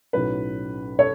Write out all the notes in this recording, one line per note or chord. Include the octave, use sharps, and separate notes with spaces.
B1 A2 F#3 C#4 B4
A4 C#5